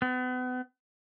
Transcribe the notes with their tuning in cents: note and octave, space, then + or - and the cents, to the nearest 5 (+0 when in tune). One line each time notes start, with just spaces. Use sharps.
B3 +35